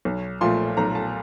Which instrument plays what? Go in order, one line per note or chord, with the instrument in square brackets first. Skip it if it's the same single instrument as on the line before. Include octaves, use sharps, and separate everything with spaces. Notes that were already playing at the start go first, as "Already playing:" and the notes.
[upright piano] B1
A#2 F3 A3 C6
B1 A#5
A5